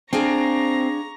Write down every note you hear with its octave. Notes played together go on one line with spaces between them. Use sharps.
C4 D4 G#4 F5 A#5 C#6 A#6